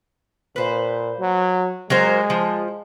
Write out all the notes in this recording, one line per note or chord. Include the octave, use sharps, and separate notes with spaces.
A#2 B4 C5
F#3
F#3 G#3 A#4 C5
F3